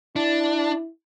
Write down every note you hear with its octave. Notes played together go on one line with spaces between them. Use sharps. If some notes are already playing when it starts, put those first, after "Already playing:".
D4 E4